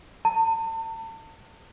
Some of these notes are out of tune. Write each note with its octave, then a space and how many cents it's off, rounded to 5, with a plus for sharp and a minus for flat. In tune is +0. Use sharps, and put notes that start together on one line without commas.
A5 +40